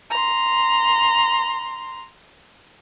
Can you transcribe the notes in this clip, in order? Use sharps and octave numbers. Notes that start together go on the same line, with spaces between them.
A#5 C6